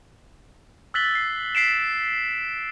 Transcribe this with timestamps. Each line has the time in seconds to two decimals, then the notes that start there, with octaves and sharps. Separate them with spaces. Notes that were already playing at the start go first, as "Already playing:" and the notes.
0.94 E6 F#6 A6 B6 F#7 G7
1.15 C7
1.55 B6 C7 D7 E7